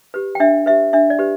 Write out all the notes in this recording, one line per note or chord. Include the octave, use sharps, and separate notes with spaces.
G4 B4
G5
D4 E5
G4 B4 E5
D4 E5
D5
G4 B4